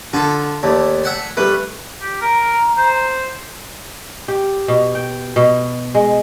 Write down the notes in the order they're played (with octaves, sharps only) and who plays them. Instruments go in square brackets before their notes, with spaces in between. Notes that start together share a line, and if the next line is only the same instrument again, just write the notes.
[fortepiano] D3 [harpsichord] F4 A4
[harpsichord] D#2 [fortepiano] A3 D5
[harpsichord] E5 F#5 G#5
[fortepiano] G3 B4 [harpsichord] A3
[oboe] G4
[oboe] A#4 [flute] A#5
[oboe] C5
[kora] G4
B2
G5
B2
G#3